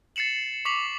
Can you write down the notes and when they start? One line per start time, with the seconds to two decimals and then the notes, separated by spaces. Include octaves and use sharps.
0.16 A6 C7 C#7 E7 F#7
0.65 C#6 D6 B6 C7 F7 F#7